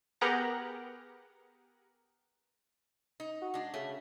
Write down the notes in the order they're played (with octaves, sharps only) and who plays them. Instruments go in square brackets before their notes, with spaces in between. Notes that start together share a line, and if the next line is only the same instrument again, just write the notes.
[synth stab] B3 G4 G#4 A#4 F#5 A#5
[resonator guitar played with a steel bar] D#4
[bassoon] F#4
[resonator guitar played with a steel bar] G#3 D4
[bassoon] C#3 [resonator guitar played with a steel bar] A3